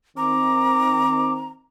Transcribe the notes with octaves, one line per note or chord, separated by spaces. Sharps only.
D#3 C4 A#5 D6